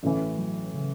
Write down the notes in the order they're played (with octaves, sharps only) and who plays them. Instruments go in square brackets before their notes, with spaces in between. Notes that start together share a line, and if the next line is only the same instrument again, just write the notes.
[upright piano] A1 A2 E3 [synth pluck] A3
[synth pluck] F#3
C#3